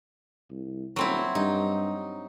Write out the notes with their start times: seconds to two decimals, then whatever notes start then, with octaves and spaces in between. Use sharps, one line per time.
0.51 C2
0.96 D#1 F#3 C4 E4
1.35 G2 D#4